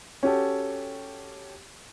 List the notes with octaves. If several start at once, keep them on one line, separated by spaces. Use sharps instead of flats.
C#4 F#4 G4 A4